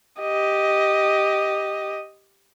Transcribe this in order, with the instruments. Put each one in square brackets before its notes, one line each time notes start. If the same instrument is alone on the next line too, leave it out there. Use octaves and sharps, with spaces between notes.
[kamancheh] G4 D#5